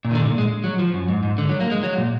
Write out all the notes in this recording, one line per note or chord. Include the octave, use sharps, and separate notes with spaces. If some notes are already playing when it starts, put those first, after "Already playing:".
A#2
D#3
D3
G#2
A#2
G#3
F#3
F3
F#2
G#2
G#2
D3
F#3
A#3
G#3
F#3
A#2